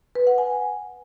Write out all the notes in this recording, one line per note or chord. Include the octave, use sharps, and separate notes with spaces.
B4
F#5
G#5